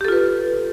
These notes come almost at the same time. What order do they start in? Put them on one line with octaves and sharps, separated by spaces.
G4 A4 F4 B4